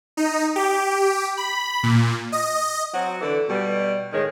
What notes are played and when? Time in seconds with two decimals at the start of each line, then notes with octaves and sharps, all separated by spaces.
0.17 D#4
0.56 G4
1.37 B5
1.83 A#2
2.32 D#5
2.94 F#3 C4 F#4
3.21 D3 E3 A4 D5
3.49 B2 G3
4.13 A2 D#3 G#3 C#5